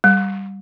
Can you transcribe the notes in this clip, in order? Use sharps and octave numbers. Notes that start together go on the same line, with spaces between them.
G3